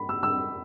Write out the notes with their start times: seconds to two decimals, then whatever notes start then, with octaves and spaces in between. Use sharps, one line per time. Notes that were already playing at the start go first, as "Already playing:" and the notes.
Already playing: B5
0.09 E6
0.23 E6